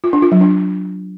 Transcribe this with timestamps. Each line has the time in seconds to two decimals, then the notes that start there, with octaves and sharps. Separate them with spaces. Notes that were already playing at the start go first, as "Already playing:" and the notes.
0.04 F4
0.13 D4
0.22 F4
0.32 F#3
0.41 D4